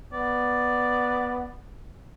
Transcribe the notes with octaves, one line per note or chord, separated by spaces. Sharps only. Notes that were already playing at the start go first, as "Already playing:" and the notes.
B3 D5